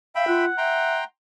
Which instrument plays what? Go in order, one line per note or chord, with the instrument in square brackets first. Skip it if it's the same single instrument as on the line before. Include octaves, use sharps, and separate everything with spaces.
[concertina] E5 G5 B5 [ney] F5
[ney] F4 [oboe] F#5
[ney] E5 [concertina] G5 A#5 C6